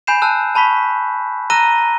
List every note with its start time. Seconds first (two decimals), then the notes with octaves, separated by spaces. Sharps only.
0.07 G#5 B5 G6 C7 E7
0.22 A5 E6 F#6
0.55 A5 B5 C#6 B6
1.50 A#5 E6 F#6 A#6 D#7 G7